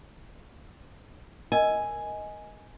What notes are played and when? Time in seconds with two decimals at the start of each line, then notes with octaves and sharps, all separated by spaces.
1.52 A#4 D#5 G#5 E6